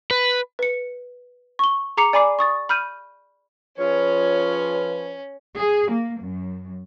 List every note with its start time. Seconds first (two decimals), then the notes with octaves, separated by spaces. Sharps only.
0.11 B4
0.59 B4 C#7
1.59 C#6 G7
1.97 G#4 A#5 D6 C7 C#7 F7
2.13 D5 G#5 B5 D6 C7
2.39 C#6 D#6 A6
2.69 B5 F6 G6 D#7
3.78 F3 C#4 F4 G#4 B4 C#5
5.57 G#4
5.91 A#3
6.22 F#2